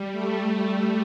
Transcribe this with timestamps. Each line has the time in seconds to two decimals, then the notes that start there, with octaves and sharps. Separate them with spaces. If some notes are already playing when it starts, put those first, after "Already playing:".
Already playing: G3
0.12 A3